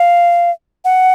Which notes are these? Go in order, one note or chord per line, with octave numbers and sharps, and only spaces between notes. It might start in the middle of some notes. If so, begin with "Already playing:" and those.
Already playing: F5
F#5